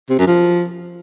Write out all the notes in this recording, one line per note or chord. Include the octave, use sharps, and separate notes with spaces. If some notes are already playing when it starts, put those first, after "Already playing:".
C3
F#2
F3